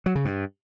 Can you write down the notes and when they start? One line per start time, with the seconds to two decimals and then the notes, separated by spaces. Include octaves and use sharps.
0.06 F#3
0.15 C#3
0.25 G2